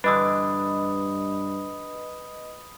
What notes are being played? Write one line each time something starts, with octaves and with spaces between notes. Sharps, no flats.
G2 D3 E3 D4 B4 D#5 B5 D#6